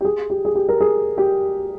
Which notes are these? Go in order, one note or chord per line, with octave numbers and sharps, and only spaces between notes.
G4
G#4
G4
G#4
G4
A#4
G#4
G4